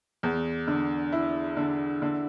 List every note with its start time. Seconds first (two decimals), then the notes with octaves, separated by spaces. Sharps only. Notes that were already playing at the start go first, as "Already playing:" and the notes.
0.23 E2
0.67 D3
1.12 E4
1.57 D3
2.02 D3